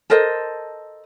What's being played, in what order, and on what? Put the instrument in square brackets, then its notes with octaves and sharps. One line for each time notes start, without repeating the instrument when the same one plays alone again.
[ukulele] A4 A#4 C5 D#5